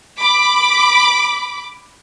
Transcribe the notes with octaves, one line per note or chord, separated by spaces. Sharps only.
B5 D6